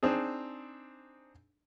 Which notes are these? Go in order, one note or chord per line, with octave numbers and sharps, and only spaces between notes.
C4 D4 D#4 G#4